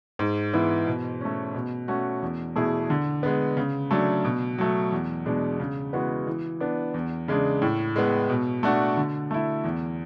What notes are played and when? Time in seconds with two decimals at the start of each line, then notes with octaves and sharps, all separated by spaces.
0.19 G#2
0.53 E3 B3 E4 G#4
0.86 B2
1.21 A3 C#4
1.54 B2
1.88 A3 C#4 F#4
2.22 E2
2.56 B2 A3 E4 G#4
2.90 D3
3.23 G#3 B3
3.57 C#3
3.91 F#3 A3 D4
4.25 B2
4.58 F#3 A3
4.92 E2
5.26 B2 G#3 D4
5.60 C#3
5.93 E3 G#3 B3 F#4
6.27 E3
6.60 B3 D4
6.94 E2
7.28 C#3 G#3 D4
7.62 A2
7.96 G#3 B3
8.30 B2
8.63 A3 D4 F#4
8.97 D3
9.31 A3 E4
9.64 E2